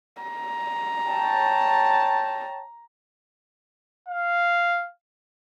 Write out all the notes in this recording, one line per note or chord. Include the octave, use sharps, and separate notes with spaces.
A#5
C#5 G5 A5
F5